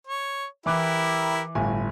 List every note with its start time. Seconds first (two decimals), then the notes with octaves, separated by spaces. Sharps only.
0.07 C#5
0.66 E3 E4 G4 A#4 D6 F#6
1.55 G1 A2 G#5